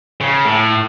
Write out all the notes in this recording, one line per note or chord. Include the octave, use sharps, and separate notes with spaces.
C#3
A2